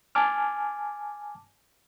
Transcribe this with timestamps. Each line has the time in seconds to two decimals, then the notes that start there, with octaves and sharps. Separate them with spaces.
0.15 G#5 A5 D6 F6